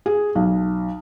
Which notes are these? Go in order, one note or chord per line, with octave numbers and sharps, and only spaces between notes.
G#4
B1